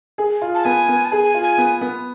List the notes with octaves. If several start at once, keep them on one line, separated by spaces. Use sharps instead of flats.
G#4
F4
A5
B3 G#5
B3
A5
G#4 G#5
F4
G#5
B3
B3